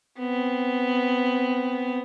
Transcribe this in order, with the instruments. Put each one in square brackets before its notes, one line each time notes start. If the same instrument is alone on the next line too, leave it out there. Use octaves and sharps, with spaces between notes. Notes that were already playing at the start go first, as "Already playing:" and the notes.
[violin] B3 C4